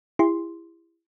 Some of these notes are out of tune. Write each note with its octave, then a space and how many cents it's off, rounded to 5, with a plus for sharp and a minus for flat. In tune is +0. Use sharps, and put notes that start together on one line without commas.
E4 +20 G4 +45 C6 +0